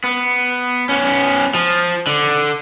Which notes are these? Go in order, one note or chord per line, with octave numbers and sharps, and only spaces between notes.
B3
B3 C#4
F3
D3